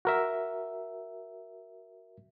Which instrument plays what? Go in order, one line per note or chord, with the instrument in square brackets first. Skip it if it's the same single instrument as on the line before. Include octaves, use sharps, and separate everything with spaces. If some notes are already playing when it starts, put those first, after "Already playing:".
[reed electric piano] F#4 A#4 E5